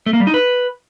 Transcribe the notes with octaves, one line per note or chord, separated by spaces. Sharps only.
A3
A#3
G3
D#4
B4